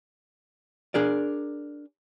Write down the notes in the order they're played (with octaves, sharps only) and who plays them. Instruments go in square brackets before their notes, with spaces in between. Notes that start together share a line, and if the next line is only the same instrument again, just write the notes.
[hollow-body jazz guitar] D4 G#4 A#4 D5